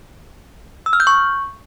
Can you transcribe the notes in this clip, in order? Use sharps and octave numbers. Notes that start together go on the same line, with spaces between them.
E6
F6
G6
C#6